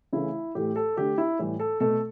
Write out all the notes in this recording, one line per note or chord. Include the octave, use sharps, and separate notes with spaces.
C#3 E3 A3 E4
A2 E3 A3 G4
A4
D3 A3 G4
E4
A2 E3 G3
A4
B2 A3 A4